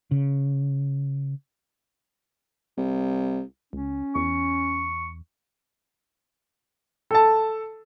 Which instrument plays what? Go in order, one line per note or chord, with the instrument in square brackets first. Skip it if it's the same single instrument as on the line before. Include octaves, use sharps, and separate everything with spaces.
[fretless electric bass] C#3
[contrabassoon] C2
[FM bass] C#2 [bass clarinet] C#4
[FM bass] E2 [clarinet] C#6
[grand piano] A4 A5